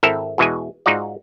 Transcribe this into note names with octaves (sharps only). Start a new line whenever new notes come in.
G#1 C4 E4 A4 A#4 E5
E2 B2 E3 G#3 G#5
G#2 D#4 F4 F#4 D5